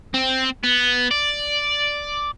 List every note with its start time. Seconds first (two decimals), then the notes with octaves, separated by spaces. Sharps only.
0.14 C4
0.64 B3
1.11 D5